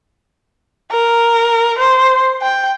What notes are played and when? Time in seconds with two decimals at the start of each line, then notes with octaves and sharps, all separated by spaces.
0.91 A#4
1.78 C5
2.42 G5